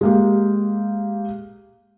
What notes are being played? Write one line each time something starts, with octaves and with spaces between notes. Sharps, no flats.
G#3 A#3 G4